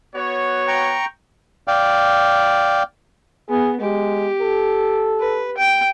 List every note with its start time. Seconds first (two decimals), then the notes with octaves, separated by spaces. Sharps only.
0.15 B3 F#4 C#5
0.68 G5 A#5 C#6
1.68 D5 F5 G5
3.49 B3 G#4
3.81 G#3 G4
4.41 A4
5.20 B4
5.58 G5